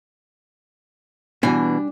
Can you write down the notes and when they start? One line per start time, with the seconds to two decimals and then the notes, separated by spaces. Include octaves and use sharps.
1.43 B2 E3 G3 D4 G#5